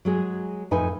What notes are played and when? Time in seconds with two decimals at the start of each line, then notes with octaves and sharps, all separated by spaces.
0.05 F#3 G#3 G#4
0.71 F2 A2 D#4 B4 G#5